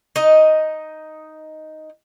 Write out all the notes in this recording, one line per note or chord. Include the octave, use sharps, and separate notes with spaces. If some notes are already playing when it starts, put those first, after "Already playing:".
D#4 D#5